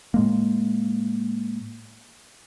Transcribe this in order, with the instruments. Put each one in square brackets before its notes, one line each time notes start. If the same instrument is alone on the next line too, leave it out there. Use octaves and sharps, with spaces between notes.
[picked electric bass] A2 G#3 A#3